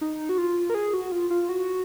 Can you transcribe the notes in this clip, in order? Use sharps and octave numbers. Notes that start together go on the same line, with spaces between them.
D#4
F#4
F4
A#4
G#4
F#4
F4
F4
F#4